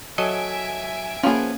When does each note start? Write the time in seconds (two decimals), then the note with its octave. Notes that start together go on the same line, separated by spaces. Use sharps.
0.18 F#3 A4 D#5 E5 G#5 D7
1.23 F3 A#3 B3 C#4 G#4